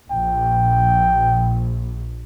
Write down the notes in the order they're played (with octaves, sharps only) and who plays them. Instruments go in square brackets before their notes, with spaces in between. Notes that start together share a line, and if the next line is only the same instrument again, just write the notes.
[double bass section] A#1 [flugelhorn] G5